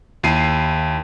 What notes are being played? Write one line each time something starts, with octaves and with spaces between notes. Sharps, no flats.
D#2 E4 C7 D#7